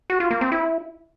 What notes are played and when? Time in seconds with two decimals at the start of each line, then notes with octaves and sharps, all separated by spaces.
0.10 F#4
0.20 F4
0.31 A#3
0.41 C4
0.52 E4